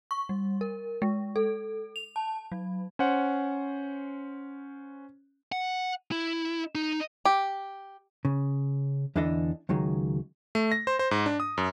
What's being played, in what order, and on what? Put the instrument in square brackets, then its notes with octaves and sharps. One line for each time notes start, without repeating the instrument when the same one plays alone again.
[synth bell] C#6
G3
A#4
G#3
A4
F7
A5
F#3
[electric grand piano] C#4 C5 F#5
[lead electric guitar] F#5
E4
D#4
[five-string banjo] G4
[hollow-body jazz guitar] C#3
E2 D3 E3 D4 A4 D#5
C#2 D#3 F#3 G#3
[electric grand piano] A3
A#6
C5
C5
G#2
D4
D#6
F#2